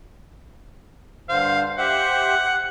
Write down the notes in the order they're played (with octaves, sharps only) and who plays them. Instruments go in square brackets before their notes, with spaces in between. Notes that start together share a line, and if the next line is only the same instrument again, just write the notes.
[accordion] G2 D3 C5 [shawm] F5
[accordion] G4 C5 E5 [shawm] F#5